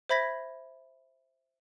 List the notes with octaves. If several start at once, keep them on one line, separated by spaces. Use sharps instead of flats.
C5 E5 B5 G#6 A#6 B6